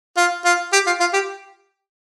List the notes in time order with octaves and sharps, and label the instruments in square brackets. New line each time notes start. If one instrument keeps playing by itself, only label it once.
[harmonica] F4
F4
G4
F4
F4
G4